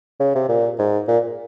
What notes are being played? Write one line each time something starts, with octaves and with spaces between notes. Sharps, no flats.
C#3
C3
A#2
G#2
A#2